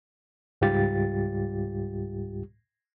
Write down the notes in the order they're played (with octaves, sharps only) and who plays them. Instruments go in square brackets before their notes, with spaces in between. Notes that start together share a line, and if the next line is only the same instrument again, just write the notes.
[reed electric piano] C#2 G#2 G3 F4 G4 A6